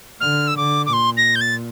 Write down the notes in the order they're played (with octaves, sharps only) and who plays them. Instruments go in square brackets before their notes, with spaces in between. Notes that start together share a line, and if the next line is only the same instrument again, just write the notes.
[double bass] D3 [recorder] F6
[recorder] E6
[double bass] D3 [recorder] D6
[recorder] D6
[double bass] A#2 [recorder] C6
[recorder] A#6
G6
A6